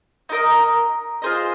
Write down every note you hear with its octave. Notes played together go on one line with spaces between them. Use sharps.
D#4 F#4 A#4 D#5
F4 G#4 C5 D#5